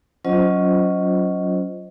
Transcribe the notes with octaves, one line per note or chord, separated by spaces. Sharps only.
F#3 C#4 F4 C5 D#5